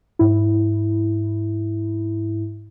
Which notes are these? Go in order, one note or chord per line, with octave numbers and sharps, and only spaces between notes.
G#2 E4